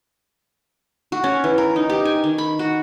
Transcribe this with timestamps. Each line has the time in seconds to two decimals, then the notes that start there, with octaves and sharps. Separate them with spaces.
1.12 F#4
1.24 C#4
1.44 E3
1.58 A#4
1.76 D#4
1.90 G4
2.05 G#5
2.24 D#3
2.38 B5
2.59 F#4